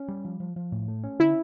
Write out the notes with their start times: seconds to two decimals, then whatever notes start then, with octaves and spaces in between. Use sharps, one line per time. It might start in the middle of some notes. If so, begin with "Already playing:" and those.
Already playing: C#4
0.08 G3
0.25 F3
0.40 F3
0.56 F3
0.72 A2
0.88 A3
1.04 C#4
1.19 D3 E4